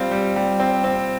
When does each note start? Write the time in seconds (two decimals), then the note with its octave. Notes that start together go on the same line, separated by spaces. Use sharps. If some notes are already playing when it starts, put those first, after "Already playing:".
Already playing: G3 C4 F4
0.11 G3
0.36 G3
0.60 C4
0.84 C4